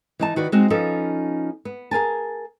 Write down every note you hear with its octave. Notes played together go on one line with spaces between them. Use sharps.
E3 D#4 A5
D#3 F#4 B4 D5
G#3 C4 D#4 F#4
F3 C#4 D#4 A4 B4
B3
G#4 A#4 G#5 A5